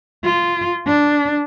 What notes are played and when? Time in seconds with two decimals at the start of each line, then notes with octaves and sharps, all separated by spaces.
0.24 F4
0.87 D4